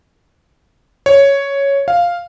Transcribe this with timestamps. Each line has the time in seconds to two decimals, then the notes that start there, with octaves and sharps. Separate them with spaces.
1.06 C#5
1.88 F5